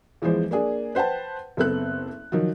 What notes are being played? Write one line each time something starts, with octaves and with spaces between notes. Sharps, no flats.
E2 E3 F3 G#3 C5
A#3 D4 G#4
B4 C5 F#5 G5 A5
F#1 B3 C4 A4 F#6
D#3 F3 F#3